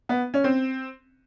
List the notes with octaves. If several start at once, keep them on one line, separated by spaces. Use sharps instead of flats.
B3
C#4
C4